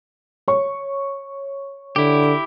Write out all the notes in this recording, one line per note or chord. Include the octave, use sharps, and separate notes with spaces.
C#5 C#6
D3 E4 G4